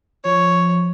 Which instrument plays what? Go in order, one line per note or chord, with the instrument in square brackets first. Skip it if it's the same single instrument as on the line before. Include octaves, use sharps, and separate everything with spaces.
[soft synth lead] F3 [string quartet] C#5